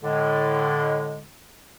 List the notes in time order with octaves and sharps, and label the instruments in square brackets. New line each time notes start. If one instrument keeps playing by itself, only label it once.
[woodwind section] A2 D3 G#3